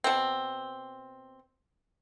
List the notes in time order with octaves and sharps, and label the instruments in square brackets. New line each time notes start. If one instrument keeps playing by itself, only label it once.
[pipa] B2 C4